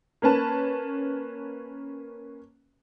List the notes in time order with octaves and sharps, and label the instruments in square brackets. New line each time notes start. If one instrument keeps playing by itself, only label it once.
[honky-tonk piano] A#3 C#4 B4 A5